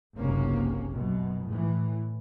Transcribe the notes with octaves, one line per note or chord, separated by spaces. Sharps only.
F#1 B1 C3 A#3 C#4
F#2 B2
A2 E3